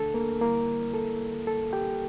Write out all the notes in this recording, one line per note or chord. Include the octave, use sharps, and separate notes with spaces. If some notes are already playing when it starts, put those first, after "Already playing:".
Already playing: D2 D3 A3 D4 A4
A#3 A#4
D3 G3 A#3 E4 A#4
A4
A4
G4 G5